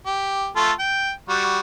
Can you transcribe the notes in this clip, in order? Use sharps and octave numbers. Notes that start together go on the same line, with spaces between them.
G4
A3 F4 A4
G5
G3 F#4